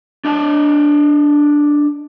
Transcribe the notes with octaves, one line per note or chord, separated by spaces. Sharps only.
D4 D#5 A5